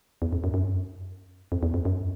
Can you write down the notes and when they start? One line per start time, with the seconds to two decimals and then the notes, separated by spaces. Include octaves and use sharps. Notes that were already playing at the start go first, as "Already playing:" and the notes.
0.22 E2
0.33 F2
0.44 F#2
0.54 F#2
0.63 G2
0.72 F#2
1.52 F2
1.63 E2
1.74 F2
1.85 F#2